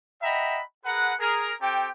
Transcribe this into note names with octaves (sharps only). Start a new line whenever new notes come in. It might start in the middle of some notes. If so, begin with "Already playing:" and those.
D#5 E5 F#5 G5 A#5 B5
G#4 A#4 B4 F#5
G#4 A#4
C4 G4 A4 G5